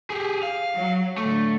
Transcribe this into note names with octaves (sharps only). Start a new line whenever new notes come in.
G4 G#4
F5
F#3
A2 D3 A3